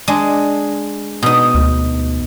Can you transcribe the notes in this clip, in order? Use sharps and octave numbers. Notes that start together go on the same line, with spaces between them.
G#3 D4
B2 D#4
D2